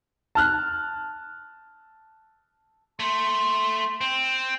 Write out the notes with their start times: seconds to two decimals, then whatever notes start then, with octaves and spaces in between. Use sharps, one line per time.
0.35 A5 F6 F#6
3.00 A3 C6
4.01 C4